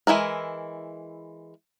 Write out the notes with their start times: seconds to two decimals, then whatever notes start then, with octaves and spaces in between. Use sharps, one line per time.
0.07 E3 G#3 E4 A#4